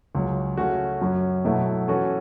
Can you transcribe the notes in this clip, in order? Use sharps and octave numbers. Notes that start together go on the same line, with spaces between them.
C#2 C#3 F#3
C#3 A3 C#4 F#4
F#2 F#3 C#4
B2 F#3 A3 E4
E3 C#4 F#4 A4